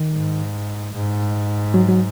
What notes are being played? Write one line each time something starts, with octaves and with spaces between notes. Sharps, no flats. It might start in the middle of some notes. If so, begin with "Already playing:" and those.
Already playing: D#3
G#2
G#2
F#3
F#3